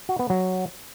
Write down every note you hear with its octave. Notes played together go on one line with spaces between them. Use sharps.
F#4
B3
F#3